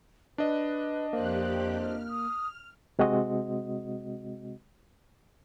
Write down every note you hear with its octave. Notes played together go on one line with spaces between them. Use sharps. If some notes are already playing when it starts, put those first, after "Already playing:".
D4 B4 D#5
F2 A#3 G4 C5 F#6
F6
D#6
C3 G#3 C4 F#4 D#5